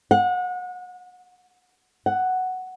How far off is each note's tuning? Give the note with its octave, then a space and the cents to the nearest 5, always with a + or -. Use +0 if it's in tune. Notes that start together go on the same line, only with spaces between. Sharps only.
F#5 -30
F#5 +5